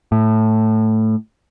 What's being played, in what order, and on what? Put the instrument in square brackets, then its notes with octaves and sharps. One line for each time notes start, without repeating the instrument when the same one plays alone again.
[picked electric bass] A2